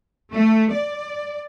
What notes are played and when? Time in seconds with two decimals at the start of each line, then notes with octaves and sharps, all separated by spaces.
0.33 A3
0.73 D5